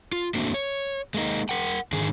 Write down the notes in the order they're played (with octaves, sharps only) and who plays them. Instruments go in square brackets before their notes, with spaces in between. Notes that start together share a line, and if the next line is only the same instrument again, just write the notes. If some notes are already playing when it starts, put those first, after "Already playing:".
[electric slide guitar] F4
A3 A#3 C4 D4 F#4
C#5
G#3 A#3 D#4
A#4 F#5 G5
G#2 D3 D#3 G#4